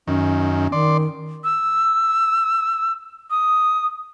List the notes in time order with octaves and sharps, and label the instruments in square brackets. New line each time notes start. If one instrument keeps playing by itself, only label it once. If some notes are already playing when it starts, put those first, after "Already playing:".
[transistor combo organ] F#2 D#3 [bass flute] C#4
[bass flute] D#3 [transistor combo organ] D5 C6
[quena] E6
D#6